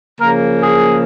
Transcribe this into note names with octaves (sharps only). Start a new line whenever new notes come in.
C#3 F3 A#3 A#4
G#4